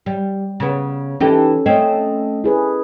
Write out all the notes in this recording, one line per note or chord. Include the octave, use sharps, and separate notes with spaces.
G3
C#3 B3
E3 C#4 D#4 G4 A4
A3 C4 C#4 D#5
E4 G#4 B4